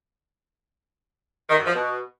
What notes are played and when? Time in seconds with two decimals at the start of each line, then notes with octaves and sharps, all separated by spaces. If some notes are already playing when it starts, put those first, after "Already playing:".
1.49 D#3
1.57 F#2
1.66 F3
1.74 B2